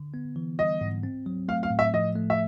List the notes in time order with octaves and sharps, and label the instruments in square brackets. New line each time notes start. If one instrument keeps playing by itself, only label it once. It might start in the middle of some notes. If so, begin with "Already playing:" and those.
Already playing: [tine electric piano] D3
B3
E3
[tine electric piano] G3 [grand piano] D#5
[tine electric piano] G#2
C4
F#3
[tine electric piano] A3 [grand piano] F5
[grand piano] F5
[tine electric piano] A2
[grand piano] E5
[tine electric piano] F3 [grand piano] D#5
[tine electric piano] A3
[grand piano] E5